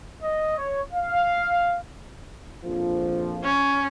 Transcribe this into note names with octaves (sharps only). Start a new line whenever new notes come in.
D#5
C#5
F5
A#1 F2 F3
C#4